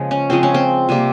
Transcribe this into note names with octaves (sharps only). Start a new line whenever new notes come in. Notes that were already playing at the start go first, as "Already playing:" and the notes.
Already playing: C#3 F3 G#3 A#3
C#4
C#3 F3 G#3 C4
C#4
C4
C3 G3 A#3